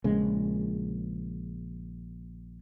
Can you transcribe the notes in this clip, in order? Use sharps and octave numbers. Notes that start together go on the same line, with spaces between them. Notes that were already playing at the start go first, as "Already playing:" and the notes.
A#1 C#3 G#3